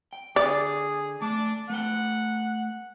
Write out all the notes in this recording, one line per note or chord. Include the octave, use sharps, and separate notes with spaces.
G5
D3 G#4 D5
A3 A5 D6
A3 B4 F#5 G5